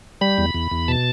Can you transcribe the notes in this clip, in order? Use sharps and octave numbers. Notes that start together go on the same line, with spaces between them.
G3 B5
E2
E2
E2
B2 A5